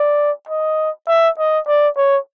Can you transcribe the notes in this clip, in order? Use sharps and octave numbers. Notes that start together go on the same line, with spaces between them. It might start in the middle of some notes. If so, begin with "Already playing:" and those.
Already playing: D5
D#5
E5
D#5
D5
C#5